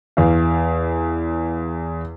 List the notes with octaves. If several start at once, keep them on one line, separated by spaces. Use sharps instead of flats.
E2 F5